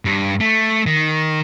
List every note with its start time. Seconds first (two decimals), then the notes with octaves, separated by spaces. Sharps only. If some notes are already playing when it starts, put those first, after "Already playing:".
0.05 G2
0.40 A3
0.86 D#3